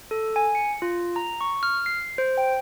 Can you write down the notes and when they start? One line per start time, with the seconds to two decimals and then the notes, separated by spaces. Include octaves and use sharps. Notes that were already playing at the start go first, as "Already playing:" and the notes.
0.11 A4
0.36 G#5
0.55 C#7
0.82 F4
1.16 A#5
1.41 C#6
1.63 F6
1.86 C7
2.18 C5
2.38 G5